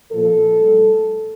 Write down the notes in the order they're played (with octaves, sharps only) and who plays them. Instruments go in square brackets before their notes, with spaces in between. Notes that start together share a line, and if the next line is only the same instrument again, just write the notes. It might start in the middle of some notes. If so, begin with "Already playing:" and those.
[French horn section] A#2 F3 A4
A2 G3